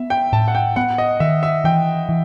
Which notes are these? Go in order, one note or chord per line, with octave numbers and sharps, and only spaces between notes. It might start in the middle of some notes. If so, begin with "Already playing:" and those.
Already playing: B3 E5
G5
A2 A5
F#5
G5
B3 F#5
D#5
D#3 E5
E5
E3 G5
E3